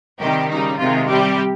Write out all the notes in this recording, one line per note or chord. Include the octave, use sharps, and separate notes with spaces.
C3 D#3 G3 G4
C#3 G3 D#4
C3 D#3 G#3 F4
C3 G3 G4